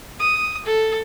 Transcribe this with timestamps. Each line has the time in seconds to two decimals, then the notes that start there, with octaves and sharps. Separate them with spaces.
0.20 D#6
0.66 A4